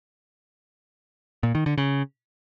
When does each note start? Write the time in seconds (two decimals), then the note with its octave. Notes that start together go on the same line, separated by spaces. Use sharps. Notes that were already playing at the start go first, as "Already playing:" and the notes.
1.43 A#2
1.55 D#3
1.66 D3
1.78 C#3